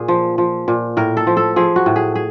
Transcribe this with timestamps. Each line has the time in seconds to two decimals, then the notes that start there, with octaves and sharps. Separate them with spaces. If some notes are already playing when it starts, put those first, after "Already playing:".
Already playing: A#2 G#4
0.08 F3
0.38 F3
0.68 A#2
0.97 A2 A#4
1.17 A4
1.27 F3
1.37 A4
1.56 F3 G#4
1.76 F#4
1.86 A2
1.96 G#4
2.15 G#4